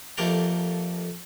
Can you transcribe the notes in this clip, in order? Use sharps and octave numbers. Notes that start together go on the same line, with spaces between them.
F2 A3 A#3 G4 G5 A#5